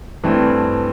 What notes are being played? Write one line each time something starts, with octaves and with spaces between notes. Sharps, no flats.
G2 E3 A3 C4